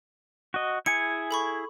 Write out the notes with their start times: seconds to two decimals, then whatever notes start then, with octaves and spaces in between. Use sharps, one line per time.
0.54 F#4 D#5
0.86 E4 G#4 G#5 C#7
1.31 A4 B5 C#6